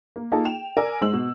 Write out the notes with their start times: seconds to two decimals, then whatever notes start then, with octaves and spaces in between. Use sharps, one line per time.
0.16 A#3
0.32 A#3 D#4 F4 G#4 A4
0.45 G5 E7 F7
0.77 A#4 D5 G#5 E6
1.01 G#2 G#3 C5 E6 F#7
1.13 B2